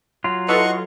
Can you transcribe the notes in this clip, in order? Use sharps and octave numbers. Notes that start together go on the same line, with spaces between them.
F#3 F4
E4 A4 B4 D#5 F#5 C#6